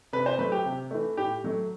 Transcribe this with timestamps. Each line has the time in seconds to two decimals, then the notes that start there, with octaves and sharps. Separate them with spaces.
0.13 C3 B4
0.26 C5
0.39 F#3 A3 B4
0.52 G4
0.65 C3
0.91 E3 A3
1.17 A2 G4
1.44 F#3 A3